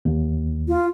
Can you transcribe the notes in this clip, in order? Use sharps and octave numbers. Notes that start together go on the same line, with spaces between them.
D#2
F4